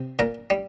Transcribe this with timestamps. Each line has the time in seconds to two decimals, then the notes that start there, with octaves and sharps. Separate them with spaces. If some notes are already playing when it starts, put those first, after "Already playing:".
Already playing: C3
0.19 A#2 A#4
0.50 G3